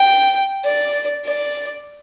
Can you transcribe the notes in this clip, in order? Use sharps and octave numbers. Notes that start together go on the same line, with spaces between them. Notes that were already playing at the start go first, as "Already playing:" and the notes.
Already playing: G5
D5
D5